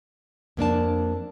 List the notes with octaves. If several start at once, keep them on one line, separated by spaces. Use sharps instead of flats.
F2 A#3 D4 A5